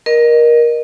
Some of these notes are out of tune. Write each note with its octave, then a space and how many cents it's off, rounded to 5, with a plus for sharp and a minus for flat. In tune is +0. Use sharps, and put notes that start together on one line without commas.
A#4 +20 D#5 -25